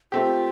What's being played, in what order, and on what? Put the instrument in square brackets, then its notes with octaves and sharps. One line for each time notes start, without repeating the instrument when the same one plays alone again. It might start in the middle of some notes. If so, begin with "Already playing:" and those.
[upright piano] A3 C4 G4 [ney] F4